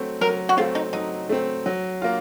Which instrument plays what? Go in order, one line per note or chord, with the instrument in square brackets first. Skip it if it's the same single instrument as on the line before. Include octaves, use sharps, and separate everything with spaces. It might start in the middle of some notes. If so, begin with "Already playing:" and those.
Already playing: [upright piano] F#3 A3 C4
[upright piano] F#3 [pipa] A#4
[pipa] F#4
[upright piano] A3 C4 [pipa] F4
[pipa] D#4
[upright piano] F#3 [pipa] D#4
[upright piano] A3 C4
F#3
A#3 F4